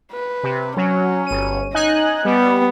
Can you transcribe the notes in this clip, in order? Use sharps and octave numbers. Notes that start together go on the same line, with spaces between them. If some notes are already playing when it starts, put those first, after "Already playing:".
B4
C3
F#3 C#4
G1 D#7
D#4 D#5 G#5 F#6
G3 B3